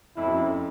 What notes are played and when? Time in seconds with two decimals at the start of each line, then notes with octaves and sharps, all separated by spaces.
0.16 F2 E4
0.27 F#2
0.37 F2